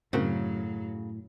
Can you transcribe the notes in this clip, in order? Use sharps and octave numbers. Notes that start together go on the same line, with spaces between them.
F#2 A2 C#3 F#3 C4 F#4 A#4